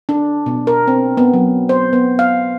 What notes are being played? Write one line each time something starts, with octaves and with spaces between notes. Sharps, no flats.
D4
B2
A#4
C4
B3
F#3
C5
B3
F5